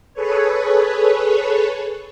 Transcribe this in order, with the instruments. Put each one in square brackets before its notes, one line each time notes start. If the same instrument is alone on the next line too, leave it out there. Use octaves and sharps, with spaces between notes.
[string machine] G#4 A4 B4 C#5